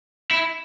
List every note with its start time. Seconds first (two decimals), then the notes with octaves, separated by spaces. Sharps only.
0.31 E4